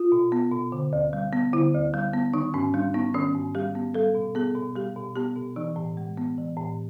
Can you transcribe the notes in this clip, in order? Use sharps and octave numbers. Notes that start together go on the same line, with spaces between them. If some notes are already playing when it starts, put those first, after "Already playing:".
Already playing: F4
B2
B3
B2
D3
D2
G3
B3
D3 E4
D2
G3
B3
D#3 D#4
G#2 C#4
G3 D4
B3 D#4
D#3 C#4
G#2
G3 G4
B3
G3 A4
B2
B3 G#4
B2
G3 G4
B2
B3 G4
B2
E3 D#4
A2
G#3
B3
E3
A2